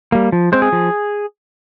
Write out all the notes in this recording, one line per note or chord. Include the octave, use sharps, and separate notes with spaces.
G3 A#3
F3
G#3 C4 C5
G#4
F3